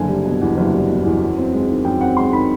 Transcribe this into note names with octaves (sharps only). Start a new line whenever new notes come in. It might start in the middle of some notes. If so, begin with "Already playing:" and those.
Already playing: F#1 D3 G#5
G3
B2
E2
F#1
G3
B2
E2
F#2
C4
G#3
D#3
F#2 G5
C4 F#5
G#3 C6
D#3 B5